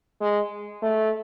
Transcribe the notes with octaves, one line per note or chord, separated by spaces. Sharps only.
G#3
A3